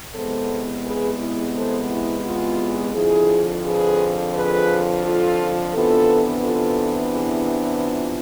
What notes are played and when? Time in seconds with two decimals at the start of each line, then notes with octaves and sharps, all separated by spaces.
0.15 E2 C3 G#3 B3 A4 C5
0.85 G#4 B4
1.20 E4
1.55 A4 C5
1.89 E4
2.24 F4
2.94 F2 D3 F3 E4 G#4
3.64 G#4 B4
4.33 G#4 B4
5.03 F4 A4
5.73 C3 E3 B3 D4 F4 A4
6.43 F4 A4
7.13 E4 G#4
7.82 F4